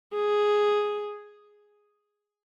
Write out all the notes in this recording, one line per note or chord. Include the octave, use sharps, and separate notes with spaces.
G#4